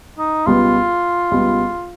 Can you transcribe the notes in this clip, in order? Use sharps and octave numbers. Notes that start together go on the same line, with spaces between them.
D#4
C#2 B2 G3 B3 F4
C#2 B2 G3 B3